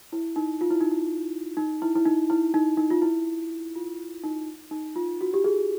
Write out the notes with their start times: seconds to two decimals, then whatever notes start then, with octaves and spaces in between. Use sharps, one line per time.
0.12 E4
0.36 D#4
0.61 F4
0.71 E4
0.81 D#4
0.91 E4
1.57 D#4
1.82 E4
1.95 E4
2.05 D#4
2.30 E4
2.54 D#4
2.78 D#4
2.90 F4
3.02 E4
3.76 F4
4.24 D#4
4.71 D#4
4.96 F4
5.21 F#4
5.34 G4
5.44 G#4